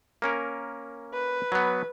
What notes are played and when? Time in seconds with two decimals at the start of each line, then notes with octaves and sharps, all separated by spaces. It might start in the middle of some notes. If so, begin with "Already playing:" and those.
0.22 A#3 C#4 A#4
1.13 B4
1.52 F#3 B3